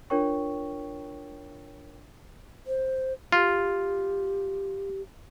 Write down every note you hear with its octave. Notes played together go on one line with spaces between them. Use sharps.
D4 F4 A#4 C#5 G5 C#6
C5
F4 G4